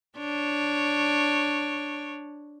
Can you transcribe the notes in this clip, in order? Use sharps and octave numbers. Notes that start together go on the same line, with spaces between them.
D4 C#5